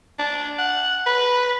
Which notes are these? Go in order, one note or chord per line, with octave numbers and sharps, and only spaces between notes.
D4
F#5
B4